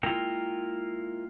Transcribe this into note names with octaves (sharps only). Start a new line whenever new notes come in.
G#3 A#3 E4 F4 A#4 G5